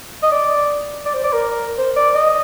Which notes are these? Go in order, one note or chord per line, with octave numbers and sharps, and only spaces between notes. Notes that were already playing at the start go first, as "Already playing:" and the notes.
D#5
D5
D5
C5
D5
A#4
C5
D5
D#5